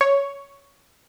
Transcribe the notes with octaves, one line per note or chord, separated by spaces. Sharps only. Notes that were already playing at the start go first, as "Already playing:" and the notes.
C#5